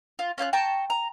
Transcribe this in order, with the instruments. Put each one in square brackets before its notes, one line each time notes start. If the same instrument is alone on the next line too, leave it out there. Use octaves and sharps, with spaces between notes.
[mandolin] F4
C#4 F4 G#5 F#6
G5 A5 A#5 C#6
A#5